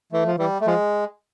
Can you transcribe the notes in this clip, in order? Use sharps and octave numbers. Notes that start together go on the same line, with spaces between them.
E3 A3
F3
E3 G3
A3
F3 G#3